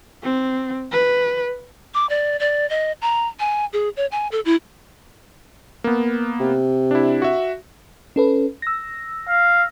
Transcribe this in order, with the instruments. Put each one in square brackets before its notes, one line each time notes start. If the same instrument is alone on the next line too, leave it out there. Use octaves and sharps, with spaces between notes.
[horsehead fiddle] C4
B4
[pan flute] D6
D5
D5
D#5
A#5
G#5
G#4
C#5
G#5
A4
E4
[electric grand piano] A#3 B3
[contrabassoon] C3
[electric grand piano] D4 E4
F#4 E5
[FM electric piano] C#4 A4 B4
E6 A#6
[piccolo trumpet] F5